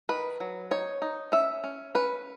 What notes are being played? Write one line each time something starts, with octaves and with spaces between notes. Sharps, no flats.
D#3 B4
F#3
D#4 C#5
D#4
C#4 E5
C#4
C#4 B4